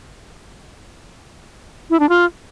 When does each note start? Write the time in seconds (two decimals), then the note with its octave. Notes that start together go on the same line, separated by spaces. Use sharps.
1.90 E4
2.00 D4
2.09 F4